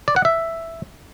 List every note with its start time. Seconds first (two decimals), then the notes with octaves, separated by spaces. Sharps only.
0.08 D5
0.16 F#5
0.25 E5